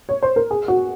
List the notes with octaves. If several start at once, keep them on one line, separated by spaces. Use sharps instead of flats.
C#5
C5
A#4
G#4
F#4